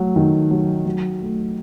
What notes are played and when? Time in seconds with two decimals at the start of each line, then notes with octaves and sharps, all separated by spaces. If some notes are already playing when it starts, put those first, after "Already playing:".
Already playing: F#3 A3
0.16 D#3
0.51 F#3
0.86 F#3
1.21 A3